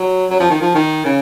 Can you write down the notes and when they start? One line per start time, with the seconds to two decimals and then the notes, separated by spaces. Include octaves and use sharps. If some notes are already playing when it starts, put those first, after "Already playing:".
Already playing: F#3
0.30 F#3
0.40 F3
0.50 D#3
0.62 F3
0.75 D#3
1.05 C#3